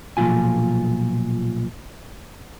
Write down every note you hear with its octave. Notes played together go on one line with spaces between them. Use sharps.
B1 A#2 E3 F3 F4 G#5